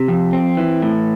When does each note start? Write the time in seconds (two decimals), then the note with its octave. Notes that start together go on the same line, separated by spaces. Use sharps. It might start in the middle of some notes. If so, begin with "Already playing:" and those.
Already playing: C3
0.08 F2
0.33 C4
0.57 E3
0.82 A2